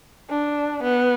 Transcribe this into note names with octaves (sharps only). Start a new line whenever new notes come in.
D4
B3